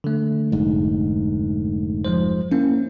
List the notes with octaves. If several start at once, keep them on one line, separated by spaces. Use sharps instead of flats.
D3 A3
F1 G#2
F3 G#3 C5
A#3 C#4 E4